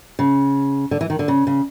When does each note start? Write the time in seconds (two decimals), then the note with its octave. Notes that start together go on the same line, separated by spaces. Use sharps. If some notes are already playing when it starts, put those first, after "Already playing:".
0.19 C#3
0.91 D3
1.01 E3
1.10 D#3
1.19 D3
1.28 C#3
1.47 C#3